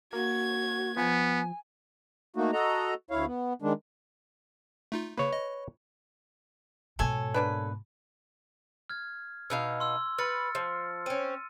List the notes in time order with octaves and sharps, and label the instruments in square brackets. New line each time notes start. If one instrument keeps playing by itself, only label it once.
[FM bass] A#3 [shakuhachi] F#4 [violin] G#6
[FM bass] F3 [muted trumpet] B3 [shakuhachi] G#5
[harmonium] A3 A#3 D#4 F#4
F#4 A4 D#5 A#5
D2 E4 C#5 F5
B3
D#3 G#3 D4
[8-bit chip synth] A3 D#4 F4
[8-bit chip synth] C#3 A#3 [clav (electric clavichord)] B4 C#5
[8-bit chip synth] D#5
[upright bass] G#2 B2 [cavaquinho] A4 C#5 G#5
[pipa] A#3 D4 B4
[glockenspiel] F6 G#6
[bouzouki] B2 D#4 F5 [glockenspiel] E6
[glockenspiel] C6 E6
[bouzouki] B4 [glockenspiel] F6 A6 C#7
[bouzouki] F3
[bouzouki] C4 C#4 [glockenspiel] D#7